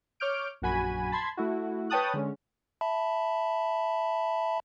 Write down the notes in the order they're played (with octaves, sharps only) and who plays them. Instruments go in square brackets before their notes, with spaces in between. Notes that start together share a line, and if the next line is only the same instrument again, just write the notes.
[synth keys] C#5 D6 F6 G6 D7
A#1 F#2 F#4 G#5 B5 D#7
A5 B5 C6 G#6
A3 E4 F#4
B4 C#5 G5 A5 D#6 F#6
D3 G#3 C#4
[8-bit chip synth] E5 A5 B5